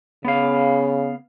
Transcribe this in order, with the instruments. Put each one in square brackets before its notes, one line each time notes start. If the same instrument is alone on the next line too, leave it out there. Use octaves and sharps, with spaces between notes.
[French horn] C#3 [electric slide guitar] B3 F5